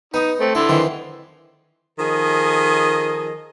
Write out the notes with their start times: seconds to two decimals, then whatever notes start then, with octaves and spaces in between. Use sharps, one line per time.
0.14 B3 D#4
0.40 A3 C4
0.55 D3 E4 A4 C6
0.69 F2 D#3 E3
1.99 D#3 F3 G#4 A4 D#5